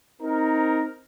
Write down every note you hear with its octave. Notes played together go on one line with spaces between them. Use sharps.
C4 D#4 A#4